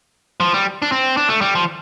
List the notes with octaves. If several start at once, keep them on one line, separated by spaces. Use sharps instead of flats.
F3
G3
D4
C4
D4
A3
G3
F3